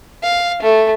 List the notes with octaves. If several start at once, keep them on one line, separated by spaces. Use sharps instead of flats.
F5
A3